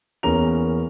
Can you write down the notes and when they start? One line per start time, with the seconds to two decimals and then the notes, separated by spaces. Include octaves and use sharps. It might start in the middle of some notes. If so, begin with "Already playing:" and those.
0.23 E2 A#3 C#4 A#5 F7